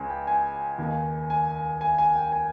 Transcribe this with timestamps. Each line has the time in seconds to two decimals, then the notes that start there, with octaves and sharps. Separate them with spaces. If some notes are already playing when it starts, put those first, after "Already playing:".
Already playing: C#2 C#3 G#5
0.10 G5
0.27 G#5
0.78 D#2 D#3 A#3
1.30 G#5
1.81 G#5
1.98 G#5
2.16 G5
2.32 G#5